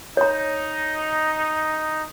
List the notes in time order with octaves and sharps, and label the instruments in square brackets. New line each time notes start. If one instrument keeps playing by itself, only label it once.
[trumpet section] D#4 [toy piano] C#5 A#5